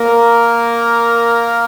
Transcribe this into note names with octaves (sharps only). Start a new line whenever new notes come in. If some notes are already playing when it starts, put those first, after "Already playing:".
Already playing: A#3 A#4